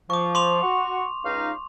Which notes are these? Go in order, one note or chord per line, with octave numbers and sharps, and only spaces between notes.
F3 C#6 D6
C6 D6 F7
F#4 C#6
C#2 D#4 F5